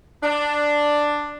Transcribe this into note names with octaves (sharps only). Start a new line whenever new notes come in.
D4